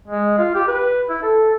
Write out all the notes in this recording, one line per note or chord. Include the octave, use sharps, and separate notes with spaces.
G#3
F4
G4
B4
E4
A4